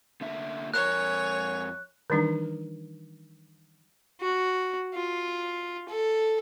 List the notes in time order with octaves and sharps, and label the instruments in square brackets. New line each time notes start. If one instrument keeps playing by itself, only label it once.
[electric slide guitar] D3 A#3 E5
[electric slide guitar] F2 A#4 [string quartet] C#5 [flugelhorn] G#5 [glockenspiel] F#6
[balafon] D#3 E3 G3 D4 D#4
[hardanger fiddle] F#4
F4
A4